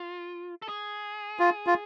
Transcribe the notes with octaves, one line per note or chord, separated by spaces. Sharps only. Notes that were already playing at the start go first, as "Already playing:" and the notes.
Already playing: F4
A4
G#4
F4
F4